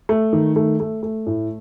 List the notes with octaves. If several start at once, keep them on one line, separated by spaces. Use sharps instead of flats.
A3
D#3
A3
A3
A3
A2